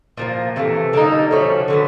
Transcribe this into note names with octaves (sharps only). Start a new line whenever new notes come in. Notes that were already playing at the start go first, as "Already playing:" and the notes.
A#2 F3 A#3
C3 E3 A3
D3 G3 A#3 D#4
F3 A3 C#4 F#4
D3 F#3 B3